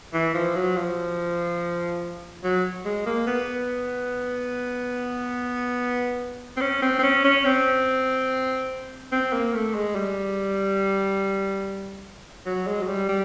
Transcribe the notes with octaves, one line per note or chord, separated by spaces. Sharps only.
E3
F3
F#3
F3
F#3
G#3
A#3
B3
C4
C#4
C4
C4
C#4
C#4
C4
C4
A#3
A3
G#3
G3
F#3
G#3
F#3
G3
G3